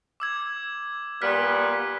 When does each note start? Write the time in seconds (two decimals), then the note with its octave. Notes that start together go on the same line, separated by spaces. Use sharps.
0.20 D6 E6 G#6
1.22 A#2 G3 B3 F6 F#6 B6